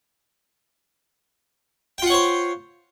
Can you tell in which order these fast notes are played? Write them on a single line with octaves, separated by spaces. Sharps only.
G5 F4 F#5 C#5 C5